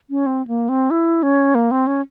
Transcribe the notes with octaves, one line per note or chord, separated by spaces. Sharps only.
C#4
C4
A#3
C4
E4
C#4
A#3
C4
C#4